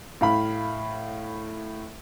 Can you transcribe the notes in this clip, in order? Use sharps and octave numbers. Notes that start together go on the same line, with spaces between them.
A2 F5 B5